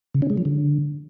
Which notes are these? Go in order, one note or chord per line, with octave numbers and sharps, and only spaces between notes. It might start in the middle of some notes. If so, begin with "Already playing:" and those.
C#3
C#4
G#3
F3
D3